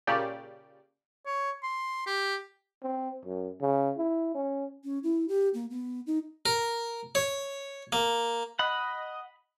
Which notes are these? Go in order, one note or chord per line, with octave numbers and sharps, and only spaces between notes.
A#2 C#3 G4 D5
C#5
C6
G4
C4
F#2
C#3
E4
C#4
C#4
E4
G4
A#3
B3
D#4
A#4
C#5
A#3
D#5 F#5 B5